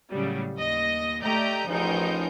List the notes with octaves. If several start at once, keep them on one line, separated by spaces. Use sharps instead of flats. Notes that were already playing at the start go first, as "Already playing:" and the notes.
A2 C#3 F#3 G3
D#2 D#5 A#6
A3 G4 D5 D#5 A#5 G6
A1 F3 D#4 G#4 A#4 G6